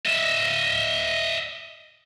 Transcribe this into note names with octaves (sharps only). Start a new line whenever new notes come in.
D#5 E5